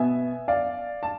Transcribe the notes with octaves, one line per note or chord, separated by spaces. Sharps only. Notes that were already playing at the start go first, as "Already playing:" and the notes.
Already playing: B2 B3 E5 G#5
D5 F5
A5